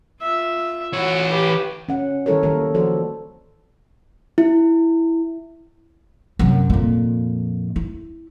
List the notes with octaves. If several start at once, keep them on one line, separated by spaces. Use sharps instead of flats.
F4 E5
E3 E4 F#4 C#5
G4 B4
C#4 F#5
D#3 G3 E4 A4 A#4 C#5
D#3 F#3 A#3 A4 A#4
F3 F#4 A4 C5 D5
E4
F#2 C3
F2 A#2
E4